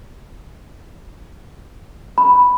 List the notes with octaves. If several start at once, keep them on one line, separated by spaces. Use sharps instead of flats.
B5